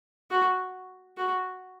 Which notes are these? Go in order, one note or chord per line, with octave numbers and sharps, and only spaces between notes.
F#4
F#4